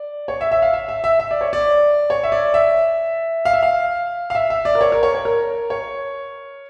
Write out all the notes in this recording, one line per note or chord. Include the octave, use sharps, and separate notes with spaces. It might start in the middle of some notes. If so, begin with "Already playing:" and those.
Already playing: D5
C#5
E5
E5
F5
E5
E5
E5
E5
D5
C#5
D5
C#5
E5
D5
E5
F5
E5
F5
F5
E5
E5
D5
A#4
C#5
A#4
C#5
C#5
A#4
C#5